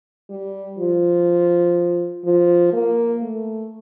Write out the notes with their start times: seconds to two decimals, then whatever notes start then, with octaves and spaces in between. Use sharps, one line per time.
0.29 G3
0.79 F3
2.25 F3
2.73 A#3
3.22 A3